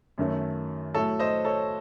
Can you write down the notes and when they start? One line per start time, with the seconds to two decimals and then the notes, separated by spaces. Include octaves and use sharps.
0.18 F#2 D#3 F#3 A3
0.94 A2 F#3 A3 A4 C#5
1.19 C5 D#5
1.45 A4 C#5